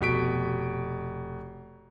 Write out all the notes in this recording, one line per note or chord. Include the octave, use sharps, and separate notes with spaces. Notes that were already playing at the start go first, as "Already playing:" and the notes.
F1 B2 B6 D7